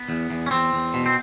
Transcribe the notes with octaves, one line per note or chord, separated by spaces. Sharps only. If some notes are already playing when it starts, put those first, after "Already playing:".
Already playing: B3
E2
E2
C#4
E2 C4
E2
B2
C4